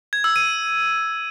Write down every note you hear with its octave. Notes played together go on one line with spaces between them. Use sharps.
G#6
E6
D#7